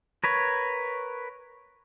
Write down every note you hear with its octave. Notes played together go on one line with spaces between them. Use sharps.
A#4 B4 C#5